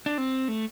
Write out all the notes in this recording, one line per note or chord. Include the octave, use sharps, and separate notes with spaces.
D4
C4
A3